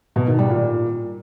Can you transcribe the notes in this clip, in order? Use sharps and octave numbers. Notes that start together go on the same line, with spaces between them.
B2
D#3
G3
A#2